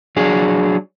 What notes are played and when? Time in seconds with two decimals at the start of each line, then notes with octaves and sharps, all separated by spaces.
0.17 F#3 D4 G#4